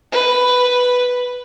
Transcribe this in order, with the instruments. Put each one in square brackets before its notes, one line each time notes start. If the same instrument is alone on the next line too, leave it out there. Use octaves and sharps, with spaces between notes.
[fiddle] B4